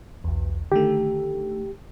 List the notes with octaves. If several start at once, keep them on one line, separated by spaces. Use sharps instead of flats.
B1 E2
D3 D#3 A3 G4